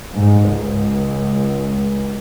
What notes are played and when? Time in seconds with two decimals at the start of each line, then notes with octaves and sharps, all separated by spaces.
0.16 G#2
0.49 C#2